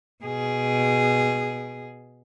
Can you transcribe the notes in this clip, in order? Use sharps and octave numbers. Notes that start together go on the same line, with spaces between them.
B2 G#4